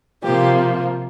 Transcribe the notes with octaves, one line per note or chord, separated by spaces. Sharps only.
C3 F3 A#3 G4